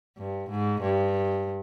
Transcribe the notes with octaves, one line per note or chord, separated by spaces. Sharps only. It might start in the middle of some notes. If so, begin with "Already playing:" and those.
G2
G#2
G2